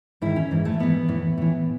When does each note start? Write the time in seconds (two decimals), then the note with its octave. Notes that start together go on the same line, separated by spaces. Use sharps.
0.22 G#2 D#3 E4
0.36 C#4
0.51 G#2 E3
0.65 A3
0.79 G#2 E3 B3
1.08 A2 E3
1.38 A2 E3